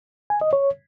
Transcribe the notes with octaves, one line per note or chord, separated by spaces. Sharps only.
G#5
D#5
C#5